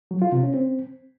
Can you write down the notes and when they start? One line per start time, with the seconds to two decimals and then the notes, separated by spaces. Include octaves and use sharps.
0.11 F#3
0.22 F4
0.32 C3
0.43 C#4
0.54 C4